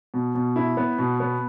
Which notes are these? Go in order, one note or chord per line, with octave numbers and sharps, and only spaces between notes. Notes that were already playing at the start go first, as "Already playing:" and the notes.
B2
B2
E4
B3
B2
B3